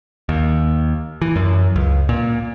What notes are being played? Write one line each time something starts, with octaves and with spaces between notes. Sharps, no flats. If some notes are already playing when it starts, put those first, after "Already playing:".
D#2
E3
F#2
C#2
A#2